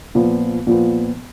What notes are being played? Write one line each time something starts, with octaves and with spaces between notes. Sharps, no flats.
A#2 F3 B3
A#2 F3 B3